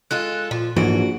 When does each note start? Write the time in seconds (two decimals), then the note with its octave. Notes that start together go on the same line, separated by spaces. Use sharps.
0.11 G#3 F4 A4 F#6
0.51 A#2 F3
0.76 A#1 G#2 E3 F#4 D7